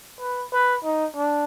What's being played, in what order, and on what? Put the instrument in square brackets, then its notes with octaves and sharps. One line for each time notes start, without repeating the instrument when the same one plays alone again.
[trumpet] B4
B4
D#4
D4